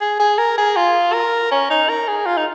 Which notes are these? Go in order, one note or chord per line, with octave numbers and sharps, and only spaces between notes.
G#4
G#4
A#4
G#4
F4
A#4
C#4
D#4
A#4
G#4
F4
D#4